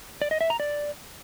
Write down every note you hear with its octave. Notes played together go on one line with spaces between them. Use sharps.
D5
D#5
E5
A#5
D5